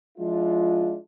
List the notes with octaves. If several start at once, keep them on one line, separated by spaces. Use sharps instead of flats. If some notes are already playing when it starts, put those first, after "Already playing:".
F3 G#3 D4 E4 F4